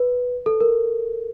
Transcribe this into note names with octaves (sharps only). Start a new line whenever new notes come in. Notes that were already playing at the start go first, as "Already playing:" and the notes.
Already playing: B4
A4
A#4